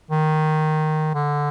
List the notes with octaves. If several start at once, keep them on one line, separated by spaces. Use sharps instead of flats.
D#3
D3